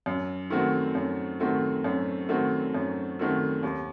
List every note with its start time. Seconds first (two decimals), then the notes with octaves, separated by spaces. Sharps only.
0.06 F#2
0.50 D#3 A3 C4 F#4
0.95 F#2
1.40 D#3 A3 C4 F#4
1.84 F#2
2.29 D#3 A3 C4 F#4
2.74 F#2
3.19 D#3 A3 C4 F#4
3.63 D#2